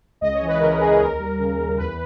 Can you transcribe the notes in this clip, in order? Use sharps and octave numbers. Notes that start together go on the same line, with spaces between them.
C#2 D#5
C#5
E3
B4
C#3 A#4
C#2 G#4
D#2 A#4
G3
C#3
D#2
E2 B4